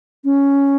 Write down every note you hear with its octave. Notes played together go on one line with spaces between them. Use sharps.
C#4